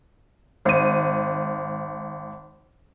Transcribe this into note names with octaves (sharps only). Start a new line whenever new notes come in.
G#1 D#7